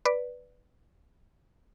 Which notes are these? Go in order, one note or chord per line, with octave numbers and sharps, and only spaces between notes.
B4 D5